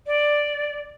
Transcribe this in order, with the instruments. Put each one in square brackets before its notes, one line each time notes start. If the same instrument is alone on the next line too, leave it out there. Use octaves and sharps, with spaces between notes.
[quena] D5